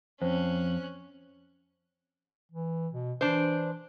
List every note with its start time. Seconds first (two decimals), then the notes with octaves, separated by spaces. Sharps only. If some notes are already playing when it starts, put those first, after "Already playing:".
0.22 F2 C#4 C5 F#6
2.52 E3
2.93 B2
3.21 E3 D4 C5